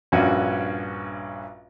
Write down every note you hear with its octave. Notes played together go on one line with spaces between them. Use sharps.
A#1 G2 C#4 F#4